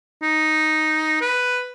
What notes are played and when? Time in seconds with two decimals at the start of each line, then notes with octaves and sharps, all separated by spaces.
0.22 D#4
1.21 B4